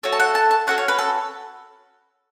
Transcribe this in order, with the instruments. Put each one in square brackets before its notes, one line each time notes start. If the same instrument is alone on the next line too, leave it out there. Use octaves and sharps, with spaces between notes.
[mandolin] A3 F#4 A4 C#5
A5
F#5
A5
A5
C#4 F#4 A4 F#5
C#5
B4
A4